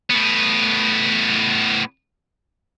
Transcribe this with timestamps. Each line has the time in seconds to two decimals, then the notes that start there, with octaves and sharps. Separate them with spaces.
0.10 A2 B3